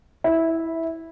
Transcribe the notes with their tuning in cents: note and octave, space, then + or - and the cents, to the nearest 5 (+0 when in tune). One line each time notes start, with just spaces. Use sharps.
E4 -10